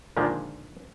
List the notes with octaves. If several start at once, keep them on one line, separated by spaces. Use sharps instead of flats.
A#2 D3 D#3 F3 G#3